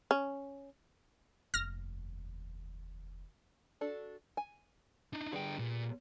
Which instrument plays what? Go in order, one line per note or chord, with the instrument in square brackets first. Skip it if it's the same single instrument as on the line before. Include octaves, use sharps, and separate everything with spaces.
[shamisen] C#4
[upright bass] F1 D#2 [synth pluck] F6 A#6
[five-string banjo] D4 F#4 A4
G#5
[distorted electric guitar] D4 D#4
[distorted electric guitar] D3 G5 [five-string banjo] G3 B3 G#4
[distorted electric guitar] A#2